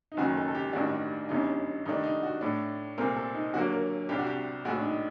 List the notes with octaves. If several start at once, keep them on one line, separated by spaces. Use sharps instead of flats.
D#4
F#1 F#2 D#3 F#4
A4
A4
G4
A1 G2 D#3 G3 D4 F#4
G1 F#2 D3 G3 D#4
G2 D#3 A3 D4 D#4
D#4
F#4
A2 A3 D4
C2 A#2 A3 C4 A#4
A4
D#4
D#2 D3 F#3 A#3 F#4
A#4
C2 C3 G3 D4 G4
F#4
G4
A#1 A2 A3 F#4
D4
D#4